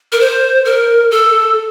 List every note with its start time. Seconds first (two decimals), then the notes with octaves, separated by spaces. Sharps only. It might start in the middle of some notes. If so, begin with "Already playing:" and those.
0.12 A#4
0.20 C5
0.65 A#4
1.11 A4